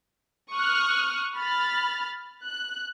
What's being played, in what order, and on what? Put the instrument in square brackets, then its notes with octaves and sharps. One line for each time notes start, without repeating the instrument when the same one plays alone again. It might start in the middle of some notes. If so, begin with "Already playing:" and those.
[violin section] C#6 D#6 F6 F#6
B5 F6 A6
F#6